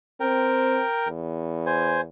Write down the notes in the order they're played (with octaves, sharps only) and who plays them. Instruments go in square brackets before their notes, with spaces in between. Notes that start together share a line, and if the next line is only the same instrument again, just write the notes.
[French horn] C4 [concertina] A#4 G5
[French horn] E2
[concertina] C5 G#5